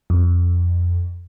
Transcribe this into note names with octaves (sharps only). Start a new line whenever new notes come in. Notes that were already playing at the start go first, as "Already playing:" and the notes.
F2